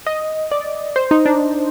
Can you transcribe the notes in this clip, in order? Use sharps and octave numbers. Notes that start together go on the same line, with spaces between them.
D#5
D5
C5
D#4
D4